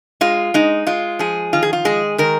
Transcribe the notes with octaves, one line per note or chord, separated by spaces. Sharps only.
G#3 F4
G#3 D#4
G#3 F4
F3 G#4
D#3 F4
G#4
F4
G#3 G#4
D#3 A#4